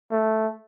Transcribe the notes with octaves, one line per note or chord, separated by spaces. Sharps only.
A3